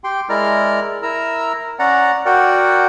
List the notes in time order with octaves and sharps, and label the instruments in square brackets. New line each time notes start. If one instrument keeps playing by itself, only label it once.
[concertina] G4 G5 C6
G#3 E4 A#4 D5 A#5 F6
E4 A#4 A#5 E6
C#4 D5 F#5 A#5
F#4 A#4 D5 F#5 G5